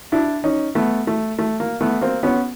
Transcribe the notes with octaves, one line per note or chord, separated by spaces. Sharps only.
D4 E4
C#4 D#4
A3 B3
A3
A3
A#3
A3 B3
A#3 C4
B3 C#4